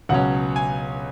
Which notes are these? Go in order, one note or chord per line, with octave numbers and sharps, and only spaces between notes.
C#2 B2 F#3 C#4 F#5
G#5